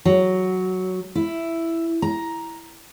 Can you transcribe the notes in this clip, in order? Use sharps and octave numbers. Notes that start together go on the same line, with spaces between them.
F#3
E4
A#5